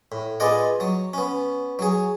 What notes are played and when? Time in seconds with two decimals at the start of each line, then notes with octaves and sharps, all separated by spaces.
0.12 A2
0.40 B3 F4 G#4 D5 D#5 F#5
0.80 F#3 D#6
1.13 B3 C#4
1.79 F#3 G#4